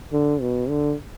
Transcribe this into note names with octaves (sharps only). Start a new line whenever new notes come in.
D3
B2
D3